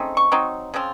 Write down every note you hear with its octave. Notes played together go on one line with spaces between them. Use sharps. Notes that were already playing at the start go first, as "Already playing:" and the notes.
Already playing: C#3 A3 C4 D#4
C#6
F#3 C4 D#4
C#3 F3 C4 F4